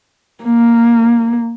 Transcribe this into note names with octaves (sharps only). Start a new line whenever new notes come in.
A#3